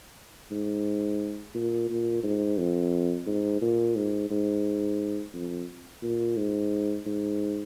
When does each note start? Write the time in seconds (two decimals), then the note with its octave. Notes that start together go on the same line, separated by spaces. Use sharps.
0.51 G#2
1.54 A#2
1.90 A#2
2.23 G#2
2.58 F2
3.26 G#2
3.61 A#2
3.96 G#2
4.30 G#2
5.34 F2
6.03 A#2
6.37 G#2
7.06 G#2